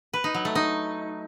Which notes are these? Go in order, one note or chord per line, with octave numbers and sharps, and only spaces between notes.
B4
D#4
F#3
A3
D#4